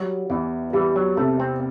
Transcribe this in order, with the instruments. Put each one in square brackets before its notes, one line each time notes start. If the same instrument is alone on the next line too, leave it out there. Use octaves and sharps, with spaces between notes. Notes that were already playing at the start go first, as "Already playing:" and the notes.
Already playing: [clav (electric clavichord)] F#3 [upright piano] G3
[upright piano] E2 [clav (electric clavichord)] E3
[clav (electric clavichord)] E3 [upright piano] G3
[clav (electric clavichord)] F#3
[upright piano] C3 [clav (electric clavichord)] A3
[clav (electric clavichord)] C4